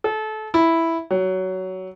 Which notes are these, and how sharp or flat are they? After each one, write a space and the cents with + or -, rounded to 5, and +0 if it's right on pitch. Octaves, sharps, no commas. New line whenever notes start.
A4 -25
E4 +0
F#3 +15